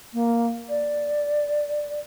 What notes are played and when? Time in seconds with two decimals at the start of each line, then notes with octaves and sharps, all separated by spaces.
0.14 A#3
0.69 D5